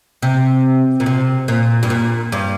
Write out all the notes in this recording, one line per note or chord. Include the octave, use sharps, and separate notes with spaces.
C3
A#2
C3
A#2
G2
A#2
G2